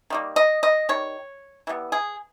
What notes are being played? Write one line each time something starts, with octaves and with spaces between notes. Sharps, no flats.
D#3 G3 A#3
D#5
D#5
D#3 G3 C#5
E3 G3 B3
G#4